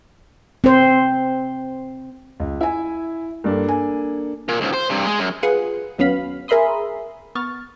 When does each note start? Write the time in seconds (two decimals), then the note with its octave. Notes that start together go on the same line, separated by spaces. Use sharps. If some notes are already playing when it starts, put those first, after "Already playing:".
0.64 C4 C5
2.40 C#2
2.61 E4 E5 G#5
3.44 G2 A#3 D4 A4
3.68 G#5
4.49 A#2
4.61 C#2 G#2
4.74 C5
4.90 G2 C3
5.06 G#3
5.19 F#2
5.43 F4 G#4 B4 F#5
5.98 D#2 F#3 B3 C#4 F5 B5
6.48 G#4 A#4 E5 B5 C6 D#6
7.35 B3 C#6 F6 A6